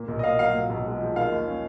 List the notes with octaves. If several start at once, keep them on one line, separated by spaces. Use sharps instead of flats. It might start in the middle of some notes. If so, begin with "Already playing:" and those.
Already playing: A#2 A#3
B1
D#5
A#3 F5
F#3 F5
A#2
B1
G#3
F3
D#3 F5
D#2
C#4